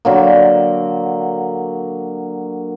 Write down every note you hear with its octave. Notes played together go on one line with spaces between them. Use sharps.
D3 F#3 A#3